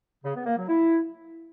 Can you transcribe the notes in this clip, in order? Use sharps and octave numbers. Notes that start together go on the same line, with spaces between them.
C#3
B3
A#3
F#3
E4